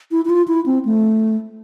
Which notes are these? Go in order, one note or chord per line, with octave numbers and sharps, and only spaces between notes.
E4
E4
F4
E4
C4
A3